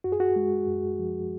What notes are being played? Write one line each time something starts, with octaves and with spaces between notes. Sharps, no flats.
F#2 F#4
G#4
F#4
G#3
F#2
F3